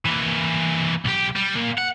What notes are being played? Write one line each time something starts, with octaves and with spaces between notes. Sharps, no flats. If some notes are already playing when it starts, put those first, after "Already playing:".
E3 A#3
B1 G4
G3
A#2
F#5